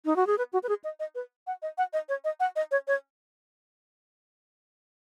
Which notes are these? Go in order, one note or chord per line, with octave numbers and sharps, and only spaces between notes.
D#4
F#4
G#4
B4
F#4
B4
G#4
D#5
D#5
B4
F#5
D#5
F#5
D#5
C#5
D#5
F#5
D#5
C#5
C#5